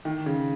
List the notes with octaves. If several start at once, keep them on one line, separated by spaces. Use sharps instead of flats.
D#3
C#3